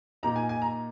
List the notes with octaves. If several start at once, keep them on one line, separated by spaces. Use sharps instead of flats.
A#2 A#3 D#4 A#5
G#5
G#5
A#5